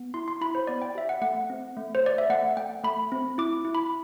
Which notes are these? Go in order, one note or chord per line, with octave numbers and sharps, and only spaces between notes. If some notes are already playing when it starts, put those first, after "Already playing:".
Already playing: B3
E4 C6
C6
E4 B5
C5
B3 D5
G5
G4 E5
F#5
A3 F#5
C4
A3
C5
A3 D5
E5
A3 F#5
A3 G5
A3 B5
C4
E4 D6
E4
B5